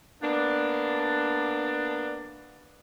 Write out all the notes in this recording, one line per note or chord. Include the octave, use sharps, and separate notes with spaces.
A#3 B3 D4